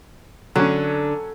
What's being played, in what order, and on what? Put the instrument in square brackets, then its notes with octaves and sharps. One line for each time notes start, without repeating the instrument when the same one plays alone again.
[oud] D3 [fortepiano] F#3 C#4